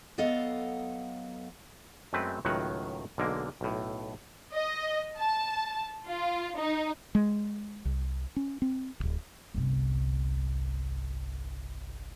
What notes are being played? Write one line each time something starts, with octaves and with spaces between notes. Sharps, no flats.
F#3 B3 A4 D#5 F5
F#2 G#3 A3 C4 B4
C#2 A2 D#3 F#3 F#5
B1 D3 G#3 A#3
B1 A2
D#5
A5
F4
D#4
G#3
C2
C#4
C4
D1 G#1
G1 C2